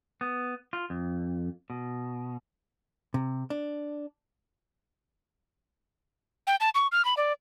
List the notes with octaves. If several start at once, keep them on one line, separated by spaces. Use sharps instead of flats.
B3
F4
F2
B2
C3
D4
G5
A5
C#6
F6
B5
D5